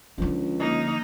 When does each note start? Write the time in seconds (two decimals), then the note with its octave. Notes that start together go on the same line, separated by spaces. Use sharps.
0.18 C#2 D3 F3
0.60 A#3 D#4 D#5